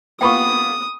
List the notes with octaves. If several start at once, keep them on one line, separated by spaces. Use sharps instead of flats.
A#3 B3 F4 G5 B5 C#6 D#6